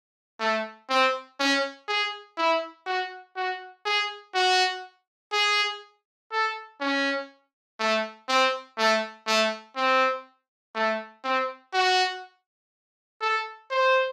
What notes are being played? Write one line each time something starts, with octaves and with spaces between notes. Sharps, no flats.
A3
C4
C#4
G#4
E4
F#4
F#4
G#4
F#4
G#4
A4
C#4
A3
C4
A3
A3
C4
A3
C4
F#4
A4
C5